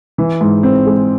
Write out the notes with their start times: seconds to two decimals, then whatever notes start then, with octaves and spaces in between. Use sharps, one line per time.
0.18 E3
0.41 G#2
0.63 C4
0.86 G#3